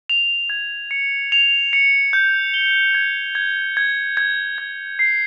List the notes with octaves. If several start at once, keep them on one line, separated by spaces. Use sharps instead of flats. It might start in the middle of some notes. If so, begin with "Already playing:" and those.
F7
G#6
C#7
F7
C#7
G6
G7
G#6
G#6
G#6
G#6
G#6
C7